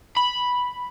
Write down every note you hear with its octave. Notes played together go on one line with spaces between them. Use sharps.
B5